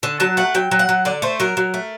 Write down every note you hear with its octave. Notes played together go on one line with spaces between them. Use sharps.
D3 A5
F#3 A5
A3 F#5
F#3 G5
F#3
F#5
F#3
D3 D5
A3 C5
F#3 A#4
F#3
A3